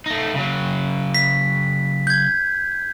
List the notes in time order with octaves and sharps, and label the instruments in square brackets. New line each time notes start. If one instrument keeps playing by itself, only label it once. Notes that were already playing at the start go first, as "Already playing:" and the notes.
[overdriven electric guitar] A3 D#4
C#3 F#3
[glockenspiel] B6
G6 G#6